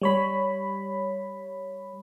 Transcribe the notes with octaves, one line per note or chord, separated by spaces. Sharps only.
G3 C#5 B5